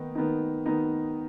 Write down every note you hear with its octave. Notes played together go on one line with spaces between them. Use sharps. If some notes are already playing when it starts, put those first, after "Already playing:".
Already playing: D#3 B3 D#4
D#3 B3 D#4
D#3 B3 D#4